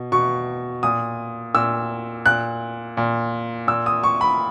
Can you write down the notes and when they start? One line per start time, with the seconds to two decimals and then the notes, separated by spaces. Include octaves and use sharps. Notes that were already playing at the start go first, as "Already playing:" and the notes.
Already playing: B2
0.12 B2 C#6
0.83 A#2 D#6
1.55 A#2 E6
2.26 A#2 F#6
2.97 A#2
3.67 A#2 E6
3.86 D#6
4.03 C#6
4.21 B5